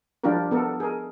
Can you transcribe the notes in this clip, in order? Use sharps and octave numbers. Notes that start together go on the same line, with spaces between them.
F3 G3 D4 F4 G4 A#4
B3 A4 A#4
G#4 A#4